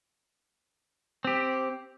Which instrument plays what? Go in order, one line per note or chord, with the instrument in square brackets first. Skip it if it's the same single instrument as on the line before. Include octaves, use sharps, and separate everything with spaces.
[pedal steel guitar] C4 G4